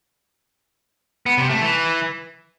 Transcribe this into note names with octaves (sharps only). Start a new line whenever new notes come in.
B3
C3
A3
E3